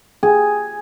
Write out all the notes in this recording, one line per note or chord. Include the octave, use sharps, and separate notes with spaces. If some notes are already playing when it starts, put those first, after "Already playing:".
G#4